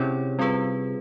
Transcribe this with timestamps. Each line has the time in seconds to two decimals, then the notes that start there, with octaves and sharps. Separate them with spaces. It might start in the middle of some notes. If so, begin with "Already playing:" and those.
Already playing: C3 C#4 E4 G#4 C#5
0.39 G3 C4 F4 G#4 B4